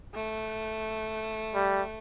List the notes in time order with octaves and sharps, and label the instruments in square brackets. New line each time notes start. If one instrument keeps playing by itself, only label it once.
[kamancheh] A3
[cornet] G3